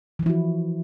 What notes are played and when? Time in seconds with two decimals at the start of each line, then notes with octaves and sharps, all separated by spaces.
0.19 E3
0.23 F3
0.26 E4
0.30 F#4